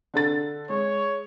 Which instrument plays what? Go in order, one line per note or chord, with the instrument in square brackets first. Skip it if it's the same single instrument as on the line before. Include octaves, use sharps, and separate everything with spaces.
[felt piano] D3 A4 A6
[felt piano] G#3 [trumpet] C#5